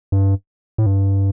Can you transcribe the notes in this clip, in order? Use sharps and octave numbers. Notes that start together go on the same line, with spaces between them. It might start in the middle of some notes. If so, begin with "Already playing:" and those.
G2
A2
G2